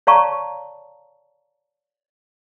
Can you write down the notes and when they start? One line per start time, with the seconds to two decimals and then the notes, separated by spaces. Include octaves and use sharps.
0.07 C#5 D5 F5 A5 A#5 C#6